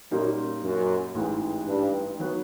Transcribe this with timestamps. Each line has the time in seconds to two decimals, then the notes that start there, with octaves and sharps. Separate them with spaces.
0.11 F#2 A#2 G3 A#3 D#4
0.63 F#2
1.15 A1 G#2 E3 G#3
1.66 G2
2.18 D#3 F#3 B3